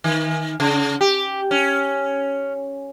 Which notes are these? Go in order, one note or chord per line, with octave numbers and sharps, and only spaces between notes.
D#3
C#3
G4
C#4